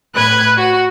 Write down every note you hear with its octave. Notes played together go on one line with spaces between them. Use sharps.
A2 B4 F#6 G#6
F#4